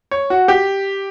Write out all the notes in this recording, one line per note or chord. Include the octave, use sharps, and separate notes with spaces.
C#5
F#4
G4